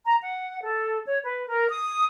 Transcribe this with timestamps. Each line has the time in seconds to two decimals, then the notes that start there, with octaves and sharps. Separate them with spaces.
0.06 A#5
0.22 F#5
0.63 A4
1.06 C#5
1.23 B4
1.48 A#4
1.69 D#6